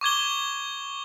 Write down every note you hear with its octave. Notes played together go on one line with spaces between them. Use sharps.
C#6 D6 G#6 G7